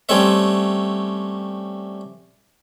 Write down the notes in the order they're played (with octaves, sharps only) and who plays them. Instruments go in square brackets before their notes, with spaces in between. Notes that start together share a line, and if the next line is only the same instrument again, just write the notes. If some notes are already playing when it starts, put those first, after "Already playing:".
[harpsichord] G3 A3 C4 C#4 C#5 E5